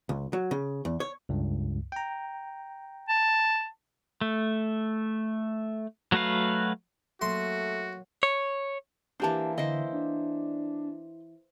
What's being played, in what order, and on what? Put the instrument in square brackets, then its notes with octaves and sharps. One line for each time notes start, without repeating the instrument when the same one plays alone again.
[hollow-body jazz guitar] C#2
F#3
C#3
E2
C#5
[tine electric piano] C#2 G2
G5 A#5
[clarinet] A5
[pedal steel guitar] A3
F#3 A3 F#4 B4 F5
[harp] F#3 A#3 [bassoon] A3 [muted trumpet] F#4 [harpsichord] C6
[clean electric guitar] C#5
[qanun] E3 A#3 C5 [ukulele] D4 G4 A5
[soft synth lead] D3 [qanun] E4 C5 [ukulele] D#5
[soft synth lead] D4